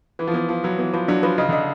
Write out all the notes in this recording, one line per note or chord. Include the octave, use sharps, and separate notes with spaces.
E3 B4
F3
E3 B3
F3 B3
F#3 B4
E3 B3
F3 B4
F#3 D4
F3 B4
C#3 D#5
D3 D#5